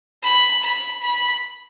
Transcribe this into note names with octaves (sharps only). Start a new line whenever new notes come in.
B5
B5
B5